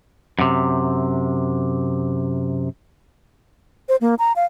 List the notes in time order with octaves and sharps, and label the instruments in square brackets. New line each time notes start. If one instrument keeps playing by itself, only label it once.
[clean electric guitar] F#2 C3
[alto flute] C5
A#3
A#5
F5